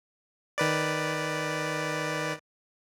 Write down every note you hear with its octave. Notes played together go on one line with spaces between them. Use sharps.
D#3 B4 D5